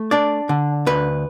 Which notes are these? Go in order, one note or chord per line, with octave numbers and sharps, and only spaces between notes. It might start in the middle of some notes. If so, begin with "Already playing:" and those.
Already playing: A3
D4 D5
D3
D2 B4